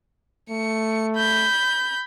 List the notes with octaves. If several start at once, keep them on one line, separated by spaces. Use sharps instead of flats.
A3 C#7
B5 G6